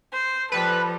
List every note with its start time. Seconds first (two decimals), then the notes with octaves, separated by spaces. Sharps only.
0.13 C5
0.52 F3 G3 A4 B4